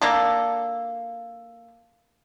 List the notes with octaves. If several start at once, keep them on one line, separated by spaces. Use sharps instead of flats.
A#3 D4 A4